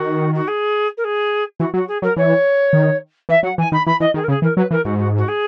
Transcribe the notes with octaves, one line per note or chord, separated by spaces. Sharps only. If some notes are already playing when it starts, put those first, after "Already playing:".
Already playing: D#3 F#4
F#4
G#4
A#4
G#4
E3 F#4
F#3 F#4
G#4
F#3 A#4
E3 C#5
D#3
E3 E5
F#3 F#5
E3 G#5
D#3 B5
E3 B5
E3 D#5
D#3 G#4
A#4
C#3 G#4
E3 A#4
F#3 B4
E3 A#4
G#2 F#4
F#4
F#4
G#4